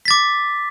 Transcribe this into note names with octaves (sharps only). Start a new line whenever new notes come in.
D6 A6 B6